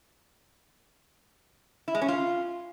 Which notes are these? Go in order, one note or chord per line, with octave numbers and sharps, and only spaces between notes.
E4
G#3
C#4
F4